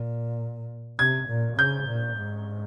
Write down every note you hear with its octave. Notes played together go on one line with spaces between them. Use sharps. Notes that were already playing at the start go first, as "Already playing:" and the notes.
Already playing: A#2
C3 G#6
A#2
C#3 G6
A#2
G#2